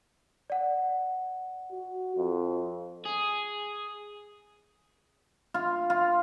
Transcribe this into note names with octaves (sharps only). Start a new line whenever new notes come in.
D5 F#5
F#4
F2
G#4
F4
F4